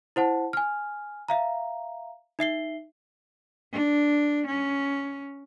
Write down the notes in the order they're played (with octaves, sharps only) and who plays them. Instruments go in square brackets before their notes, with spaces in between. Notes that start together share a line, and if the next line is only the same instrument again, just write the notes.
[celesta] E4 C5 F#5 A5
G#5 F6
E5 F5 A#5
D#4 E5 C7 G7
[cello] D4
C#4